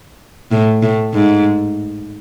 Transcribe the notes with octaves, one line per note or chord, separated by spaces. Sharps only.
A2
A2
G#2